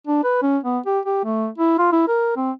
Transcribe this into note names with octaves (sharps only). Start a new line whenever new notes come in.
D4
B4
C#4
B3
G4
G4
A3
E4
F4
E4
A#4
C4